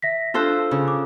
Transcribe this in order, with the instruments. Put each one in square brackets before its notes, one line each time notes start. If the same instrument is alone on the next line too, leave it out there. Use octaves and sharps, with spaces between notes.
[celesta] E5 A#6 B6
[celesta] D4 E6 F#6 [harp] F4 A4 C5
[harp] C#3
[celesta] D6